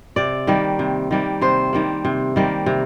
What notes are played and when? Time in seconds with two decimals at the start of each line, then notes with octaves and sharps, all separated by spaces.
0.16 C3 D5
0.47 D#3 G3 A#3
0.79 C3
1.11 D#3 G3 A#3
1.41 C3 C5
1.73 D#3 G3 A#3
2.05 C3
2.36 D#3 G3 A#3
2.66 C3